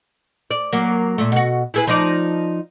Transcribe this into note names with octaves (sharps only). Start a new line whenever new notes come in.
D5
F#3 A#3
A#2 A3
B2 F#4
E4 G#4 B4
F3 D#4 D5